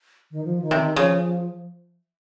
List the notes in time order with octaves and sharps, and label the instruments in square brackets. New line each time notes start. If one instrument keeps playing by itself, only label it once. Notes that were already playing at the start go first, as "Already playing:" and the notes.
[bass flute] D#3
F3
D#3
[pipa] C3
[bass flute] D#3
[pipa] C#3 [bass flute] F3